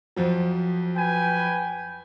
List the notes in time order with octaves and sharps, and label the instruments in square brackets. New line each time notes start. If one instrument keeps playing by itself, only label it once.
[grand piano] F2 F3 F#3
[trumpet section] B4 G5 G#5